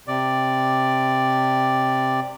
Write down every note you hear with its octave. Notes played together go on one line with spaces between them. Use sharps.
C3 D5